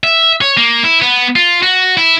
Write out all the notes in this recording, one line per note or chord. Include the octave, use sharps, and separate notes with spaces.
E5
C#5
A#3
E4
B3
F4
F#4
E4